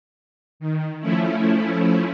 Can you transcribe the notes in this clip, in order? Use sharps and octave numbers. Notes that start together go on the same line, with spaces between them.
D#3
F3 A3 C#4 E4